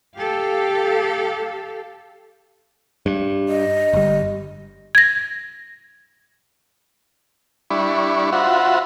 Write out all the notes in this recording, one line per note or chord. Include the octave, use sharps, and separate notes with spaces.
G4 A4 F5
G2
D#5
G1 G3
G#6 A#6
G3 D4 E4 B5 C#6
F4 F#4 C5 E5 F#5 B5